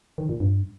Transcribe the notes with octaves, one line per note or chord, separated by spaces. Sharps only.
D#3
A#2
G2